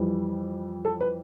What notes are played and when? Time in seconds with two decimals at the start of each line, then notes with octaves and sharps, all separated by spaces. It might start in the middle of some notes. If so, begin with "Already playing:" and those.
Already playing: F2 E3 G3
0.85 A4
1.01 B4